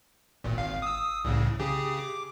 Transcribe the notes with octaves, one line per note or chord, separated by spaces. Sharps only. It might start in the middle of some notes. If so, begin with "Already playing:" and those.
G#1 A#2
G#1 F5
D#6 E6
C2 A2 C#3
C#3 G4 G#4
D6